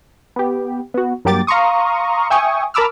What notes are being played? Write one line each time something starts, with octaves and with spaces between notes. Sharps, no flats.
B3 G4
B3 F#4
G2 F#3 A#3 G4 D6 A6
F5 A#5 C6 C#6 D#6
E5 G5 G#5 C#6 D#6
A#4 A5 B5 D6 E6 F6